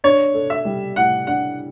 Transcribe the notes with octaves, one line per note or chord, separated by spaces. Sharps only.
D4 C#5
A4
E5
G3
A2 F#5
D4 F#5